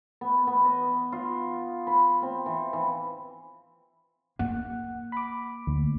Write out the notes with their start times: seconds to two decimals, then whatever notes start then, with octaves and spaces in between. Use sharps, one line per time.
0.21 B3
0.47 B3
0.65 D#5
1.12 F4
1.87 B5
2.23 C4
2.46 E3
2.73 E3
4.39 A#3 F#5
5.12 B5 D6
5.67 D2